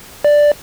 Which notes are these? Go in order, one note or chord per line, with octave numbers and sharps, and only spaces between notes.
D5